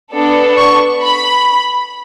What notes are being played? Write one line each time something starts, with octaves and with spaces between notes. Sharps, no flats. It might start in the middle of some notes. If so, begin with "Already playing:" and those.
B3 D4 A4
C#6
B5